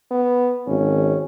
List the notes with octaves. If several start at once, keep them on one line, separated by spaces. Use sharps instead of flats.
B3
G#1 C#4